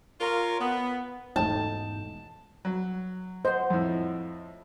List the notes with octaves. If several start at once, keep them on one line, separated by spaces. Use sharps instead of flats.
F4 A#4 C#5
B3
E1 E2 G#2 A3 D#4 A5 G6
F#3
C5 D#5 F#5
F2 A2